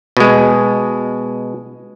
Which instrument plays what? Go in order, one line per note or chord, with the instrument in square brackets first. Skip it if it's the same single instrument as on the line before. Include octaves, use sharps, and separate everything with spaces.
[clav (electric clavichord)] B2 G#3